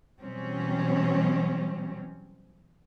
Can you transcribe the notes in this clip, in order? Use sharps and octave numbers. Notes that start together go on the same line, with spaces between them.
B2 E3 F#3 G3 C4 C#4